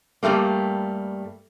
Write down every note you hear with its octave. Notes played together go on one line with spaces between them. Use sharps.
G2 B2 G3 A3 A#3